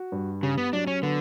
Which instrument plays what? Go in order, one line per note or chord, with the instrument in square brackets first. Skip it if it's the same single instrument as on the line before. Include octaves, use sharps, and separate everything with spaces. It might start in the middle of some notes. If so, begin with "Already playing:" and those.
Already playing: [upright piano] F#4
G2
[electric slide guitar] C#3 [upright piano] G4
[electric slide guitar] B3
[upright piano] F#3 [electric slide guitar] D4
[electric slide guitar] C#4
[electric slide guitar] D3 [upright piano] B3